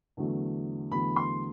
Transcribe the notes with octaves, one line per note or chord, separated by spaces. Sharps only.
E2 D3 F#3 A3
E2 D3 F#3 A3 B5
C6